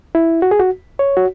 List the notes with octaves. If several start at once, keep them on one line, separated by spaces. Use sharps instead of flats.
E4
F#4
G#4
F#4
C#5
F#4